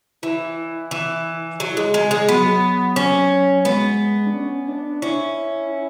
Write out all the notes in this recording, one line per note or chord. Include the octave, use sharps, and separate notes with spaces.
E3 E4
E3
F#3
G#3
G#3
G#3
F#3 B3
C#4
G#3 B3
D4
C#4
C#4
D4
C#4 E4
E4